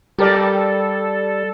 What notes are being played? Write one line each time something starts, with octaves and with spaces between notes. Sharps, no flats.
G3 G4 A4 A#4 D5